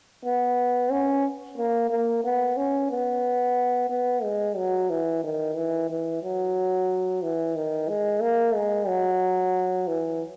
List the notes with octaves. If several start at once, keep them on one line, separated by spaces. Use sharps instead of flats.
B3
C#4
A#3
A#3
B3
C#4
B3
B3
G#3
F#3
E3
D#3
E3
E3
F#3
E3
D#3
G#3
A#3
G#3
F#3
E3